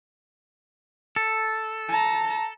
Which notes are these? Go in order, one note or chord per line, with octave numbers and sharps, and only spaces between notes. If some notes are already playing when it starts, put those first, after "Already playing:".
A4
A5 A#5